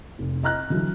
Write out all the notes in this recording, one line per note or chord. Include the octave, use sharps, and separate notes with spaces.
F1
D#5 A#5 F6 F#6
D3 E3 F#3 E4